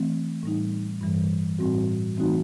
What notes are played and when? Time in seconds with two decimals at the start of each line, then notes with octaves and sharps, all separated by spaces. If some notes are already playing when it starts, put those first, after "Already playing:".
Already playing: E3 A3 C4
0.43 A2 G3 D#4
1.01 G2 E3 G3
1.59 A2 G3 C4 F#4
2.17 E3 A3 C4 D#4 F#4